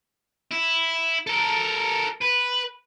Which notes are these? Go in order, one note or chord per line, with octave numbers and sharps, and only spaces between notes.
E4
A4 A#4
B4